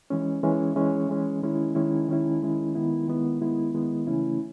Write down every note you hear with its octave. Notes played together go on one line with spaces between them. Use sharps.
E3 G#3 C#4
E3 G#3 C#4
E3 G#3 C#4
E3 G#3 C#4
D#3 G#3 C#4 E4
D#3 G#3 C#4 E4
D#3 G#3 C#4 E4
D#3 G#3 C#4 E4
D#3 G#3 B3 E4
D#3 G#3 B3 E4
D#3 G#3 B3 E4
D#3 G#3 B3 E4
C#3 E3 A3 C#4 E4